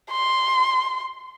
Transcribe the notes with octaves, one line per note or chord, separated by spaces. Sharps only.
C6